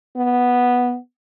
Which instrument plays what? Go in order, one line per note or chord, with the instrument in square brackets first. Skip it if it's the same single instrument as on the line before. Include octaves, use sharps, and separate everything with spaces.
[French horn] B3